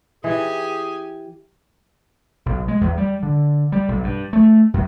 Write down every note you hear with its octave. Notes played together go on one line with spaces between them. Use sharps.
E3 G4 G#4 G#5
B1
G#3
E2
G3
D3
G3
B1
G2
A3
F#2